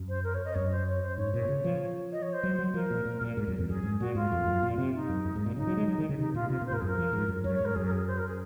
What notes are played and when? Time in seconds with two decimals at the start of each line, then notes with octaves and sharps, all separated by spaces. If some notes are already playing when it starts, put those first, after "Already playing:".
Already playing: F#2
0.09 C5
0.24 A#4
0.34 C#5
0.45 D#5
0.55 F#2 C#5
0.72 C5
0.87 C#5
1.02 C5
1.18 G#2 C#5
1.34 A#2 C#5
1.49 C#3
1.64 F3
2.12 D#5
2.22 C#5
2.33 C5
2.43 F#3
2.59 F#3
2.74 F3 A#4
2.90 A#2
3.05 A#2
3.21 A#2
3.37 G#2
3.48 F#2
3.58 F2
3.68 F#2 G#4
3.84 G#2
4.00 A#2 F#4
4.15 G#2 F4
4.32 F2
4.47 F#2
4.63 A#2
4.78 C3
4.93 D#4
5.09 F#2
5.25 F#2
5.36 G#2
5.46 A#2
5.56 C#3 D#4
5.67 F#3
5.77 G#3
5.88 F#3
5.98 D#3
6.09 C#3
6.19 C3 D#4
6.34 A#2 F4
6.50 C3 F4
6.61 A#2
6.66 C5
6.71 G#2 A#4
6.81 F#2 G#4
6.87 A#4
6.98 F3
7.13 G#2
7.28 F#2
7.44 F#2 C#5
7.55 C#5
7.60 G#2
7.65 A#4
7.75 F#2 G#4
7.86 A#4
7.91 G#4
8.07 C5
8.17 A#4
8.28 G#4